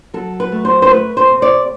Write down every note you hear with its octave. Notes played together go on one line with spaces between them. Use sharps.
F#3 A4
B4
A3
C5
C5
A3 B4
C5
C3
D5